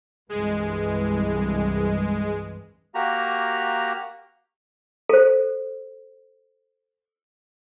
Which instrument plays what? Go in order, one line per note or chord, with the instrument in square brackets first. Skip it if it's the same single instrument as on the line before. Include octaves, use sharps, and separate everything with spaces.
[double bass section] C2 G2 E3 [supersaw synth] G#3
[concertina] A#3 F#4 G4 A#5
[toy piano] A4 C5